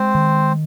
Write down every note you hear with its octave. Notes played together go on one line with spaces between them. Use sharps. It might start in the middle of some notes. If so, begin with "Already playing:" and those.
Already playing: G#3 C4 C5
D#3